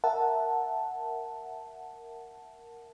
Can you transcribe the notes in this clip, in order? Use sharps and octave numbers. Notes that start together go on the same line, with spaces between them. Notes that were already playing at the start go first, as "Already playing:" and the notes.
A#4 E5 F#5 A5